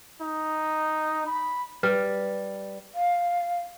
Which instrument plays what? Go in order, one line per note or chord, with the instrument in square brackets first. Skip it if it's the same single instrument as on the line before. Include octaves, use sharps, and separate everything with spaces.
[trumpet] D#4
B5
[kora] G3 [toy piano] B4
[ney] F5